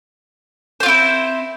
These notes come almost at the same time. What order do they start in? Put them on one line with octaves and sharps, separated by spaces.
C5 F4 C4 E4